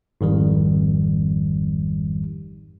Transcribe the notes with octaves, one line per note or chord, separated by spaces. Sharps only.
G#1 F2 D#3 G3